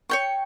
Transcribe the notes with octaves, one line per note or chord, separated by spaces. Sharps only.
C#5 G5 C#6